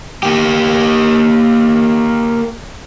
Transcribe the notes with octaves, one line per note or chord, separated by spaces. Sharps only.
A#3 G4